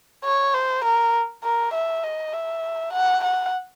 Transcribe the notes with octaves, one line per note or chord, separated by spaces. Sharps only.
C#5
C5
A#4
A#4
E5
D#5
E5
F#5
F#5